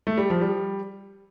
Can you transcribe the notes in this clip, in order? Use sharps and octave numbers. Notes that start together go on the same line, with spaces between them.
A3
G3
F3
G3